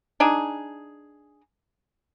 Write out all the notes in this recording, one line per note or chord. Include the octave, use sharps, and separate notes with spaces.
D4 D#4 G#4